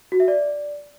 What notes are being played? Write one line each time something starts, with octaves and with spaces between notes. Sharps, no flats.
F#4
E5
D5